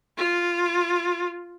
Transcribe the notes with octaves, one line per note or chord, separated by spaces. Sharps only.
F4